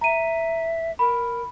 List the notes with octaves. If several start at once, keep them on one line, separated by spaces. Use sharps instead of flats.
E5 A#5 D#7
A#4 B5